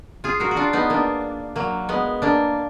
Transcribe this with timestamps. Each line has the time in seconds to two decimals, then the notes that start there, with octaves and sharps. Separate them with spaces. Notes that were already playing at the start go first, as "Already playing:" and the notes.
0.24 F4 G#4
0.40 F#4 A#4
0.51 F#4
0.56 D4 F4
0.73 B3 D#4
0.90 A#3 D4
1.56 F#3 A#3
1.89 G#3 B3
2.22 A#3 D4